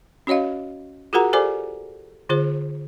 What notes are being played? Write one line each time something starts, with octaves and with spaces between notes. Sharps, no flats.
C#4 F#4 C#5 D#5 F5
F4 F#4 G#4 A#4 F#5 A#5
G4 A4 C5 D5 G#5 D6
D3 F4 G#4 C5